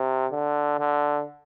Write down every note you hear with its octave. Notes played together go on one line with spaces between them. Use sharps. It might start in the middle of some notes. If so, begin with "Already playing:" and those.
Already playing: C3
D3
D3